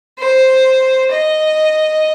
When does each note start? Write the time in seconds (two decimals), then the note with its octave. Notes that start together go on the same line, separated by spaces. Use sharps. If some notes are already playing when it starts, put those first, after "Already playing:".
0.19 C5
1.11 D#5